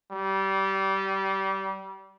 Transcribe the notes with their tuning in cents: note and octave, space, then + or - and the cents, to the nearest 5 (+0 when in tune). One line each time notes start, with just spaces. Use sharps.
G3 -25